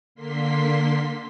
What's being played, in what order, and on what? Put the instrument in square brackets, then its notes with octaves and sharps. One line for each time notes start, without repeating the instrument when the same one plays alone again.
[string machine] D3 A#3 C6 B6